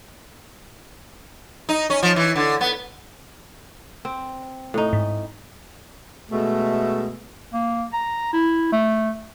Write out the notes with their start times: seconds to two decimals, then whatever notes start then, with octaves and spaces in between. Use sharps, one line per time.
1.69 D#4
1.90 C#4
2.03 F3
2.16 E3
2.36 D3
2.61 B3
4.05 C4
4.74 A2 D#4
4.93 G#2
6.31 B2 G#3 A3
7.53 A#3
7.93 A#5
8.33 E4
8.72 A3